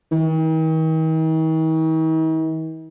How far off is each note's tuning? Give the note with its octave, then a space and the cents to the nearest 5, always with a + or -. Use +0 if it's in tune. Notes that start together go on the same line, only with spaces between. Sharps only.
D#3 +45